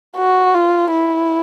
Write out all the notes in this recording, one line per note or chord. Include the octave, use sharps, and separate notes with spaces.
F#4
F4
E4